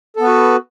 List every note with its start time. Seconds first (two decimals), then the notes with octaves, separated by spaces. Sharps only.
0.17 A4
0.20 B3
0.23 B4
0.27 F#4